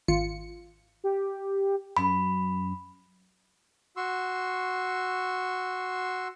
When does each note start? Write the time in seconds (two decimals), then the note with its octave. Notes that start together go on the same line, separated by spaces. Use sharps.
0.08 G#1 F4 C#7
1.04 G4
1.97 F#2 B5
3.97 F#4 C6 C#6 E6